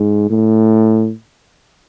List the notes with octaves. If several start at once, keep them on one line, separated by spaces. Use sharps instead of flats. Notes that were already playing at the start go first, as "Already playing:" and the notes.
Already playing: G#2
A2